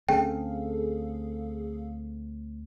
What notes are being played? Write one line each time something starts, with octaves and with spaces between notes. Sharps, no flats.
D2 C4 C#4 G#4 A4 F5 G5